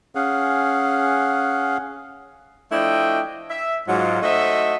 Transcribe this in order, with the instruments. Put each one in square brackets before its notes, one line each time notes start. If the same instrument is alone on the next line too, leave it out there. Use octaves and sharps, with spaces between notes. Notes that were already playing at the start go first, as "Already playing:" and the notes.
[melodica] C#4 G#4 F5 F#5
[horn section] F3 A3 D4 E4 D#5 G5
E5
G#2 F#3 F4
A3 D#4 F#4 C5 D#5 E5